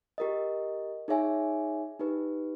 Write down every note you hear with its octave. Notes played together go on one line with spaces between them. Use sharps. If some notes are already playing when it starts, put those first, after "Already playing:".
G4 A#4 D#5
D#4 G#4 C#5 E5 G#5
D#4 G4 B4